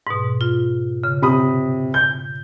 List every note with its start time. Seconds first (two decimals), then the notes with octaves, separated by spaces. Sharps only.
0.07 G#2 B2
0.41 F4
1.04 C#3
1.22 C3 B5 D#6
1.94 G6